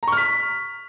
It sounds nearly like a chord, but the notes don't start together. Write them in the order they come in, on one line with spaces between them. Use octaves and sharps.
A#5 C#6 F6 B6